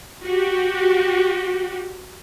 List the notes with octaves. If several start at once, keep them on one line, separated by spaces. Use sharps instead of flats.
F#4 G4